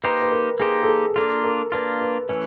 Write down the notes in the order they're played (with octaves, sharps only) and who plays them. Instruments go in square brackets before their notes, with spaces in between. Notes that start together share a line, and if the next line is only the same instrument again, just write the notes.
[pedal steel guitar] A#3 D#4 G4 C5 [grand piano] B4
[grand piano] B4
A#4
[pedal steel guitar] A#3 D#4 G4 C5 [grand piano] G#4
[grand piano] A4
G#4
[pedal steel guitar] A#3 D4 F4 [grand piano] A4
[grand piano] A#4
[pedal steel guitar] A#3 D4 F4 [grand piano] B4
[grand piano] B4
[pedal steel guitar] E3 A3 C#4 [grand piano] B4